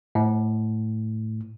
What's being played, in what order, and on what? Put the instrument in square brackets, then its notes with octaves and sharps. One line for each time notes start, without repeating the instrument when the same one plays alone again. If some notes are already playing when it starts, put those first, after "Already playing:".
[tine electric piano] A2